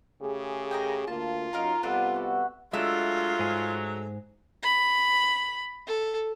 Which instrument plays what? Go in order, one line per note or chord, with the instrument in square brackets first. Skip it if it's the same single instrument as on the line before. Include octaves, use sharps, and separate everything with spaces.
[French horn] C#3 [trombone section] A3 G4 G#4
[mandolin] A#4 D#5 G5
[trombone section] D2 A#3 [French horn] F4 [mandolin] A5
[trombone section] F#2 F#3 D#4 [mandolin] A#4 F5 A#5
[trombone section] C3 G3 B3 [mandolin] A4 B4 D5 [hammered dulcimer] E5 F#5
[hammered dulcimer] F#4 B5
[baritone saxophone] F#3 [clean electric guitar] G#3 D4 [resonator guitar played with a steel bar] A3 E5 [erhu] F4
[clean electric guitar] G#2 G#4
[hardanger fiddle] B5
A4